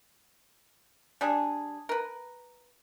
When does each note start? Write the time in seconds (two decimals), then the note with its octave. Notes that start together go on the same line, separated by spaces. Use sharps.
1.21 G3 D4 G#4
1.89 A#4 B4